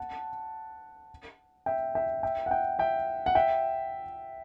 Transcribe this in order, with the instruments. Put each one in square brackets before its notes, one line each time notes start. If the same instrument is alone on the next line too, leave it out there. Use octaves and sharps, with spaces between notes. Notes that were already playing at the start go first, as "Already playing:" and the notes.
Already playing: [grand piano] F#5 A5
E5 G5
E5 G5
E5 G5
F#5
E5 G5
E5 G5
F#5
E5 G5